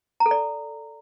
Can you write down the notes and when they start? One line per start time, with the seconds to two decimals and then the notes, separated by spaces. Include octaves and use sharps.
0.20 A#5
0.26 A4
0.31 D5